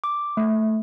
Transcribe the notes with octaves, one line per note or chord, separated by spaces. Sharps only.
D6
A3